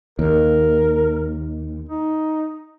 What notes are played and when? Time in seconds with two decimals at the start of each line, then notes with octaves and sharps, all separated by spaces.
0.19 D#2 A#4
1.89 D#4